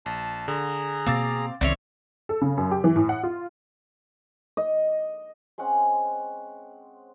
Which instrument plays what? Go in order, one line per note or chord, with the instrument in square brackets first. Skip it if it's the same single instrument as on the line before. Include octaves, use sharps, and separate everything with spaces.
[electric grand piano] A#1 [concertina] A5
[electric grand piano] D3 [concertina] G#4 A#5
[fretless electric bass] B2 A#3 [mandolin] C4 [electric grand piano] F5 D6 A6
[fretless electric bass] C2 C3 D#3 [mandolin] C4 C#4 C#5 [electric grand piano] D5 E5
[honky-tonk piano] A4
C#3
F#2
G4
E3
A2
F#5
F4
[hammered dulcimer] D#5
[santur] G#3 C4 C#4 F#5